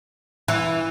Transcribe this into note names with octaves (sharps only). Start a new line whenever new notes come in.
E3